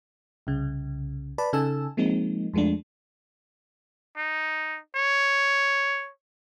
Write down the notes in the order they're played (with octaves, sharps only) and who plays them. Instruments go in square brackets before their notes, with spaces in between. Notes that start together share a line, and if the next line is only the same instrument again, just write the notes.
[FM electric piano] C2 C#3
B4 D5 A5 B5
C#3 D#4 A4 G#5 A5 E6
F3 G#3 A#3 C4 D#4
F2 F3 G#3 A3 D4
[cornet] D#4
C#5